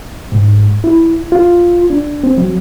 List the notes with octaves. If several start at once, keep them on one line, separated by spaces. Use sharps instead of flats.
G#2
E4
F4
D4
C4
F#3